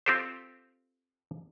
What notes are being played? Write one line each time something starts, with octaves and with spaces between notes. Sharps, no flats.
C4 F4 G4 A4 C5